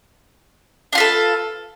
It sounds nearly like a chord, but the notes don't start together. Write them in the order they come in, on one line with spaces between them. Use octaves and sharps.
D4 F4 B4 A4